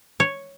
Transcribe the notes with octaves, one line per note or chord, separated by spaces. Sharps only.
C#5